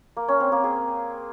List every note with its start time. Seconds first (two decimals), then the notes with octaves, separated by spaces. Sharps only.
0.17 A#3
0.28 C#4
0.40 C4
0.52 A#3
0.64 G#4